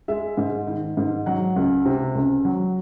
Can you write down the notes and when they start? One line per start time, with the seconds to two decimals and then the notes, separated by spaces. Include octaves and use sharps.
0.08 G#3 E5
0.37 G#2
0.68 D#3
0.97 G#2
1.26 F#3 F#5
1.56 C#2
1.85 C3
2.15 C#2
2.45 F#3